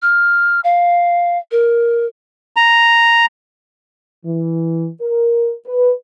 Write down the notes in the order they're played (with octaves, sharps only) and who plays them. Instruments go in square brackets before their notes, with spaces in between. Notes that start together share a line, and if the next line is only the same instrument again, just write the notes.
[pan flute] F6
F5
A#4
[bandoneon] A#5
[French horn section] E3
A#4
B4